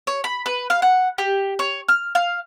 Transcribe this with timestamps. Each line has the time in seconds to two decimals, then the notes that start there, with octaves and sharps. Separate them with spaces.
0.07 C#5
0.24 B5
0.46 B4
0.70 F5
0.82 F#5
1.18 G4
1.59 C#5
1.88 F6
2.15 F5